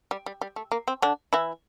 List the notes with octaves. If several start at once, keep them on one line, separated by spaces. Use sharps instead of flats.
G3
G3
G3
A3
A#3
C4
D3 D4
E3 E4